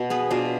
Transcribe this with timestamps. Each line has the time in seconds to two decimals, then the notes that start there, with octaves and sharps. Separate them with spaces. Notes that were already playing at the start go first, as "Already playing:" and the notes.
Already playing: B2
0.10 B3 G#4 B4
0.31 B2 D4 F4